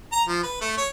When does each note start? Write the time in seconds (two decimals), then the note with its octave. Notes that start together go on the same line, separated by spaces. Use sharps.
0.12 A#5
0.28 F3
0.43 B4
0.61 A3
0.77 C#5